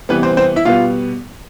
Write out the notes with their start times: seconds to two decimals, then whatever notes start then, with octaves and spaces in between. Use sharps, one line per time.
0.09 C3 E3 G3 B3 B4
0.23 C4 C5
0.37 C4 C5
0.56 E4 E5
0.65 B2 G3 B3 F4 F5